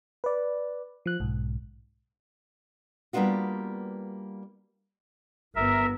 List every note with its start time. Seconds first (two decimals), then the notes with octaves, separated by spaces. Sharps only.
0.24 B4 D5
1.06 F3 F#6
1.20 B1 G#2
3.13 G3 A#3 B3 D4 F4 F#4
5.56 G1 B3 A#4 E5